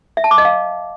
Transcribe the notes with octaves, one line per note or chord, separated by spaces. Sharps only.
E5
A5
D6
D#5
F5